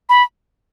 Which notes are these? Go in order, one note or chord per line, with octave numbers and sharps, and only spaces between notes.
B5